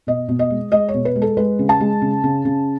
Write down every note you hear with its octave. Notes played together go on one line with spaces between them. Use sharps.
B2 D#5
B2
D#5
G#3
G#3 D#5
C#5
B2
B4
G#3
A4
G#3 B4
C#3
A5
G#3
C#3
C#3
C#3